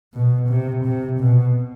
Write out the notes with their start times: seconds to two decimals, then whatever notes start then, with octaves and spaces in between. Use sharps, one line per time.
0.14 B2
0.48 C3
0.85 C3
1.20 B2